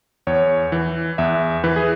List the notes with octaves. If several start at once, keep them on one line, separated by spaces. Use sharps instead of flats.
E2 C#5
E3
E2 E5
E3 B4
G#4